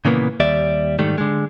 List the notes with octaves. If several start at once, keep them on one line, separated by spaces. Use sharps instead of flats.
A#2 C#3 E3 A#3 B3
D#2 G3 D5 E5
G#2 D#3 G3 A3
D3 G#3